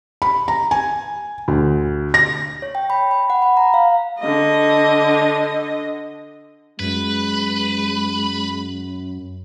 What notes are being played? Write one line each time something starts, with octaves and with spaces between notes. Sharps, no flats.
B5
A#5
G#5
D2
A#6
C#5
G5
B5
B5
F#5
B5
A#5
F5
D3 D#5
F#2 G#3 B4